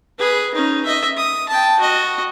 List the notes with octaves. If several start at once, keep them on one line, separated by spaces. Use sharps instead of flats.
G#4 B4
C#4 D#4
D#5 E5
D#6
G5 A5
F#4 D#5